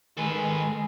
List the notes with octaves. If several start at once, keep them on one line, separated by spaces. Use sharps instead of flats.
D#3 G#3 G#4 A4 B4